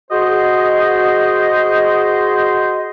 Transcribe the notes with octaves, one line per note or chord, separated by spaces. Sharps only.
F#4 G#4 C5 D#5